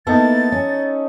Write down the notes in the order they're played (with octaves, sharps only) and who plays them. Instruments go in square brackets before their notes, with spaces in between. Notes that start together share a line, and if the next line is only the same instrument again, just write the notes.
[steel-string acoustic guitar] A#3 B3 E4 [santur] D#4 A4 [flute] A6
[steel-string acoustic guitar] C#4